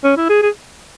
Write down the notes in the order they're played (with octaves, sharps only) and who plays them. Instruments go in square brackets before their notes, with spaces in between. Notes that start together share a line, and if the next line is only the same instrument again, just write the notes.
[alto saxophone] C#4
E4
G#4
G#4